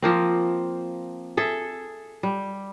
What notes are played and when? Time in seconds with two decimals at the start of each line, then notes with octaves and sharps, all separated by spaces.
0.02 F3 A#3 C4
1.37 G#4 A4 E5
2.23 G3